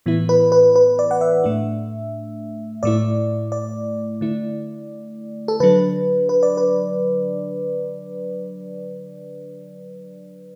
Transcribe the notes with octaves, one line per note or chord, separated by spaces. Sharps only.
A2 E3 B3 E4
B4
B4
B4
D5
F#5
E5
A2 A3 D4
A2 A3 E4 D5
D5
D3 A3 E4
A4
D3 F#3 D4 B4
B4
D5
B4